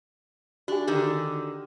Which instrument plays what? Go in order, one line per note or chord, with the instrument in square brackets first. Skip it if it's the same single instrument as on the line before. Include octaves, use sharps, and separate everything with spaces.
[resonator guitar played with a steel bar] D4 [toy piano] F#4 G4 G#5
[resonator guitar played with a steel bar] D3 D#3